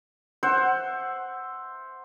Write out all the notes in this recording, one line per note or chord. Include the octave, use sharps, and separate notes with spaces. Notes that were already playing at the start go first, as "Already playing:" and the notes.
C5 E5 F#5